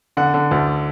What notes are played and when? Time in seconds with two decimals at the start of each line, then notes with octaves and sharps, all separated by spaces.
0.17 D3 F#5
0.34 D3
0.51 D2